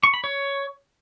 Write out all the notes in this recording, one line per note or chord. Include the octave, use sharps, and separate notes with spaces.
C#6
B5
C#5